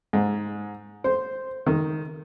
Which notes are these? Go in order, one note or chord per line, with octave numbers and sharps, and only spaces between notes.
G#2
C5
D#3